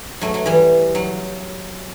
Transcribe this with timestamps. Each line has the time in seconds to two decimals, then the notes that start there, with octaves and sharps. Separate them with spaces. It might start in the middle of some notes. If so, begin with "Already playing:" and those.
0.21 F#3 A3
0.34 F#3
0.46 E3 G3
0.95 F#3